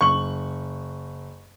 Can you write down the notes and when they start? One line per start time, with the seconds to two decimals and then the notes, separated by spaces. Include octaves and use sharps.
0.01 F#1 C#6 F#7